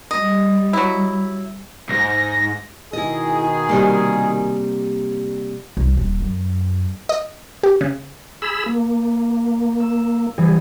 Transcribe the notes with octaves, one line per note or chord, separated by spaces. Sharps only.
G3 D#5
F#3 E4
B1 G#2 A#6
B2 D#3 E4 G#4 D#5
C3 G3 A#3
C2
D#1
F#2
D#5
G4
C#3
G#4 B5 E6
A#3
E6
E3 G3 G#4